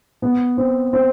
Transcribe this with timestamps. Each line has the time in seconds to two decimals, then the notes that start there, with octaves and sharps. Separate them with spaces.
0.22 B3
0.57 C4
0.93 C4